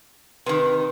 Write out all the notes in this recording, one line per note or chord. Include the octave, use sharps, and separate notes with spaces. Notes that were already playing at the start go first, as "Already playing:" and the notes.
C3 D#3 B4